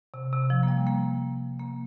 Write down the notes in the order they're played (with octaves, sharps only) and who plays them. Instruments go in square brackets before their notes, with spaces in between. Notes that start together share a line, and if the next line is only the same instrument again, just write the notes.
[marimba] C3
C3
F3
A#3
G3
A#3
A#3